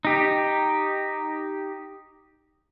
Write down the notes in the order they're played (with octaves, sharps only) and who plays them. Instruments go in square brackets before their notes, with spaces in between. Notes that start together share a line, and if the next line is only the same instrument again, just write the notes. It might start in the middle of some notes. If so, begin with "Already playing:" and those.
[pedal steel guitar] D#4 G4